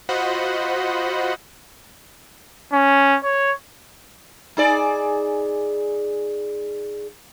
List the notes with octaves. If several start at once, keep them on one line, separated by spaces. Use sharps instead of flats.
F4 F#4 C5 D#5 F#5 B5
C#4
C#5
D#4 G#4 D5